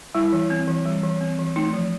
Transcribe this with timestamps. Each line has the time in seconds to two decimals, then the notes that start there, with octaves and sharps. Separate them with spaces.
0.15 G3 E4
0.33 E3
0.50 C4
0.67 E3
0.86 G3
1.03 E3
1.21 C4
1.39 E3
1.56 A3 D#4
1.73 F3